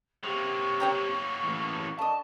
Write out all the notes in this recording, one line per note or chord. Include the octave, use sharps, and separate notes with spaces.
F#3 A#3 G4 C5 C#6
C#5 G5 A#5
A2 E3
D3 D#5 A5